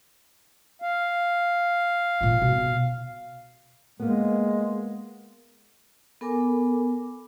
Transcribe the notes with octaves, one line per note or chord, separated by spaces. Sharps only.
F5
A#2 F4
B2
G#3 A#3 B3
B3 A4 A#4 G#5 D6